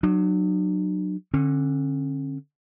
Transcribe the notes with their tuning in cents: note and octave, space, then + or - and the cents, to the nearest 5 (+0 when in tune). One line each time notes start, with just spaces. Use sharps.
F#3 +0 D4 +45
D3 +0 C#4 -40